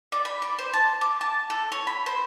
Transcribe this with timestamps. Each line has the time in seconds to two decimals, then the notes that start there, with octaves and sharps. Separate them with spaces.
0.12 D5
0.25 B5
0.42 D5
0.59 C5
0.73 A5
1.01 D6
1.21 A5
1.50 A4
1.72 C#5
1.87 B5
2.06 C5